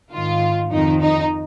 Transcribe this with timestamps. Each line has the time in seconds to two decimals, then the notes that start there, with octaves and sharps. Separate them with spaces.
0.12 G#2 D#3 F4
0.71 F2 D#3 D#4
1.01 D#4